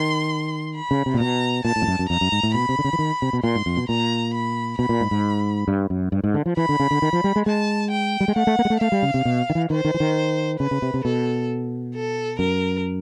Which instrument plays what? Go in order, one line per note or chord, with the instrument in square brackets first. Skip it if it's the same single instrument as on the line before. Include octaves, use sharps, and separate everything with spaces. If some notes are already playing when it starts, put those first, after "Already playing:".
Already playing: [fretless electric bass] D#3 [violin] C6
[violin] B5
[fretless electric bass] C#3
C3
A#2
[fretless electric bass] B2 [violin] A#5
[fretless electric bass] A#2 [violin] A5
[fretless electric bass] A2
F2
F#2
F#2
[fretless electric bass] F2 [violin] A#5
[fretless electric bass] F#2
G#2
A2
[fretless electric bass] B2 [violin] B5
[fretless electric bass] C3
D3
C#3
E3
D#3
C3
B2
[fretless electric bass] A#2 [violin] C6
[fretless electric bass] G#2
F2
B2
[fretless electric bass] A#2 [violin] A#5
[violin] B5
[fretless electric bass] B2 [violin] B5
[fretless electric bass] A#2
G#2
G#2
G2
F#2
G2
G#2
D3
F3
[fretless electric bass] E3 [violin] B5
[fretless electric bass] D3
C#3
D3
D#3
F3
G3
G#3
[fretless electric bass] G#3 [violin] A5
[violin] G5
[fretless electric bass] G3
G#3
[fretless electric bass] A3 [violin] F#5
[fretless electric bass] A3
A#3
G#3
A3
[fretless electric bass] A3 [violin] F5
[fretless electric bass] G3
C#3
C3
B2
D#3
E3
[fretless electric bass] D#3 [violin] C5
[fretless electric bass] D#3
E3
D#3
[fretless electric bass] C#3 [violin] B4
[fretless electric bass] C#3
C3
C3
[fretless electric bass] B2 [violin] A4
[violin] A4
[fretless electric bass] F#2 [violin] A#4